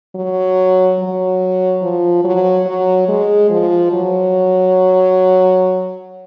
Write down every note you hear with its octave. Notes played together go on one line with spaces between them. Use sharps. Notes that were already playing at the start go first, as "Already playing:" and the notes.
F#3
F#3
F3
F#3
F#3
G#3
F3
F#3